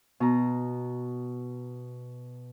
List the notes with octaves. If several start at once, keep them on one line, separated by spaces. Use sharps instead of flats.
B2 A#5